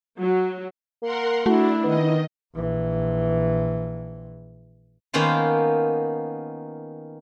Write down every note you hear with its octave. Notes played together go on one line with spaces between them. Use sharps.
F#3
A#3 A#4 F#5 C6
A3 D4 E4 F#4
D#3 B3 D#5
A#1 E3
D#3 A#3 B3 C#4 F4 C5